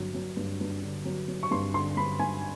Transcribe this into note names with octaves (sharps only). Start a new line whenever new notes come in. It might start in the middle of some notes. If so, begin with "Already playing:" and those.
Already playing: G2 D3 F#3
F#3
G2
G2
D3
F#3
F#3
C#6
G2 C6
D3 C6
G2 B5
G2 G#5